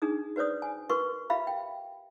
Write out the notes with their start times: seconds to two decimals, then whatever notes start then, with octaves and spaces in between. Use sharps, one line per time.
0.02 D4 D#4 G#4 D#6
0.36 F#4 B4 C5 D5 D#6
0.62 G#5
0.90 F#4 A#4 B4 C6 C#6
1.30 F4 G4 E5 F5 B5
1.47 G5